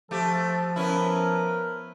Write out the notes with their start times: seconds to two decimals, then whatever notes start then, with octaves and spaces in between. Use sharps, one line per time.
0.11 F3 A3 G4 A4
0.76 B3 C#4 E4 A#4